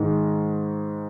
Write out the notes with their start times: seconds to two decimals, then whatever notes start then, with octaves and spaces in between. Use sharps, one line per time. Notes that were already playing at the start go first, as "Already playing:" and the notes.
Already playing: G#2 D#3 G#3